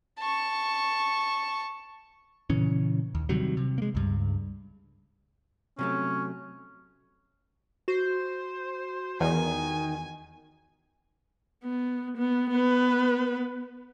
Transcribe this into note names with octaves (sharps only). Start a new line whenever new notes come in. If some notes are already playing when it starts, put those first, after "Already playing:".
A5 C#6
A#2 C#3 E3 C#4
D#2
C3 D#3 F#3 G3
C3
G#3 A#3
C#2 G2
C3 F#3 A3 C#4
F#4 C5
E2 D#3 G#5
B3
B3
B3 B4